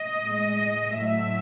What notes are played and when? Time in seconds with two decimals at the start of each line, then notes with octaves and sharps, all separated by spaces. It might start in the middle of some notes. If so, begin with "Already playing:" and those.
Already playing: D#5
0.20 A2 G#3
0.92 A2 F#3 A3 E5